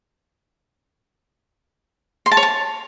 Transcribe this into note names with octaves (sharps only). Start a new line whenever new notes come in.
C6
A5
C#5
A5